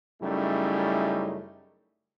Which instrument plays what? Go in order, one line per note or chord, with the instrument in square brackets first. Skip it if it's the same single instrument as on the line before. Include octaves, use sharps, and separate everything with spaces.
[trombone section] F#2 C#3 G3 A3 D#4 E4